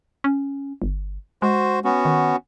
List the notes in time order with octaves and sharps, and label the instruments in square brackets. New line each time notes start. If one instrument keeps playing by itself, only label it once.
[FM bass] C#4
G1
[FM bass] G#3 [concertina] F#4 C5
[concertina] B3 C#4 F#4
[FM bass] D#3